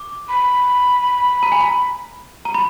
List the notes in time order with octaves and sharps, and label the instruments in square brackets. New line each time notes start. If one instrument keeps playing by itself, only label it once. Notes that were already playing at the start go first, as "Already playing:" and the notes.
Already playing: [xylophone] D6
[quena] B5
[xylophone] A#5
G#5
A#5
A#5
B5